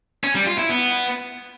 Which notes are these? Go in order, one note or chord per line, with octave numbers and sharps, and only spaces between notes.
C#4
G3
F4
E4
B3